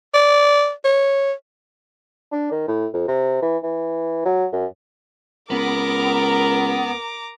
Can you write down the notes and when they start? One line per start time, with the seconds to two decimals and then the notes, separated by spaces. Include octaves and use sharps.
0.14 D5
0.84 C#5
2.32 D4
2.51 D#3
2.68 A2
2.93 F2
3.08 C3
3.42 E3
3.63 E3
4.25 F#3
4.53 F#2
5.50 C#2 B3 A#4 A#5 D6